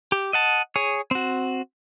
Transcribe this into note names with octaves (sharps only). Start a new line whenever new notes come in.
G4
D#5 F#5 A5
G#4 C#5
C4 F#4